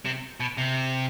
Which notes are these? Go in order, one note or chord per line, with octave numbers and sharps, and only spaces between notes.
C3
B2
C3